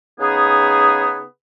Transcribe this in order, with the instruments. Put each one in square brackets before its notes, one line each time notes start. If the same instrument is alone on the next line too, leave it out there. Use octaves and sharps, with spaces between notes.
[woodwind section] C#3 B3 D#4 G#4